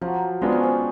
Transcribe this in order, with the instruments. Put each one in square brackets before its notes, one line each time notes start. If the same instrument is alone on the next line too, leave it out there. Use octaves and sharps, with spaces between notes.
[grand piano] F3 [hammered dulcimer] F#3
[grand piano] G#3 B3 D4 F4 [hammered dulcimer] C4
[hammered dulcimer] C#4
C4